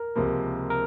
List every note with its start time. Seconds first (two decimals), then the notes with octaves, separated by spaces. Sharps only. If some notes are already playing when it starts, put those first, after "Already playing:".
Already playing: A#4
0.16 C#2 C3 F3 A#3
0.70 A#4